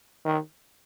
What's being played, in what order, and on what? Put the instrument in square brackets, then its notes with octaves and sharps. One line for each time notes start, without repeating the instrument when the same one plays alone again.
[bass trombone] D#3